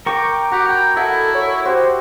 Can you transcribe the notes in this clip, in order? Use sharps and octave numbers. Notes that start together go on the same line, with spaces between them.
A#4 G5 A#5 C#6 D6
F#4 G4 A#5
G5 B5
E4 A4 D#5 E5 F#5
C#5
F#4 G4 C5 E5